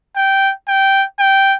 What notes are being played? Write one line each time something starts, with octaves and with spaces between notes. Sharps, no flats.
G5
G5
G5